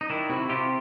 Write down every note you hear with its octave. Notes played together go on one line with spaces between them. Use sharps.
D#4
D#3 D4 E4
C3 E4 F#4
C3 F4 G4